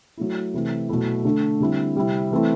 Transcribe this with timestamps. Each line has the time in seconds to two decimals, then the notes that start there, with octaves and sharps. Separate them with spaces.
0.17 F#3 A3 E4
0.54 C3 E3 A3 C4 E4
0.89 B2 F#3 A3 E4
1.25 D3 A3 D4
1.60 D3 G3 C4 E4
1.96 C3 G3 C4 E4
2.31 E3 A3 C4 E4